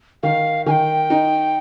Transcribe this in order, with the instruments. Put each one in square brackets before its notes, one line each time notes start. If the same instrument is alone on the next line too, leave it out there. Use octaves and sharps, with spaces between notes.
[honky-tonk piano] D#3 [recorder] F5
[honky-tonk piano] D#3 [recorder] G#5
[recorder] G5
[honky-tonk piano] D#4